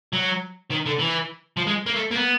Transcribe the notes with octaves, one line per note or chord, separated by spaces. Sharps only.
F#3
D#3
D3
E3
F3
G#3
A#3
A3
A#3
B3